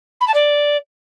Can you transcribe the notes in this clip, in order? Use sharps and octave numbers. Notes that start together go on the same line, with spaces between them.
B5
A5
D5